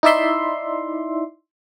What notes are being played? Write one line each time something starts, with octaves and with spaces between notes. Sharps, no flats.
D#4 E4 D5 E5 C6